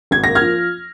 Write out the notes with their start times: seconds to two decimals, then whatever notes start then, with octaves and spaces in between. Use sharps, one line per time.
0.11 G#1 G#6
0.24 A#3 A#6
0.35 F6 G#6
0.41 F3